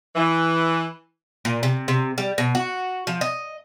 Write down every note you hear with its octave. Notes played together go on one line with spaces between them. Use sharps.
E3
A#2
C3
C3
G3
B2
F#4
F3
D#5